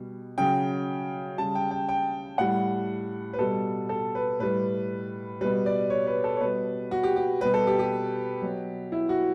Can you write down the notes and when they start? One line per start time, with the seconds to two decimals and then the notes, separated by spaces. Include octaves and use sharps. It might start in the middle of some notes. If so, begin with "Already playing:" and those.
Already playing: B2 G3
0.38 C#3 F#3 G5
1.38 C#3 G3 A5
1.55 G5
1.71 G5
1.89 G5
2.38 A2 G3 F#5
3.33 B4
3.39 B2 G3 A4
3.89 A4
4.15 B4
4.39 A2 G3 B4
5.41 B2 G3 B4
5.66 D5
5.90 C#5
6.07 B4
6.24 A4
6.37 C#5
6.40 B2 G3 B4
6.91 F#4
7.03 G4
7.16 G4
7.41 B2 G3 B4
7.54 A4
7.67 G4
7.79 G4
8.42 B2 F#3
8.92 E4
9.09 F#4